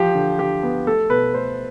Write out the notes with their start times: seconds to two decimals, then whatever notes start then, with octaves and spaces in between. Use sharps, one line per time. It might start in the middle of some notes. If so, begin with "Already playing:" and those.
Already playing: F3 G4
0.15 D3
0.39 D3 G4
0.63 B3
0.87 A3 A4
1.10 B2 B4
1.34 A3 C5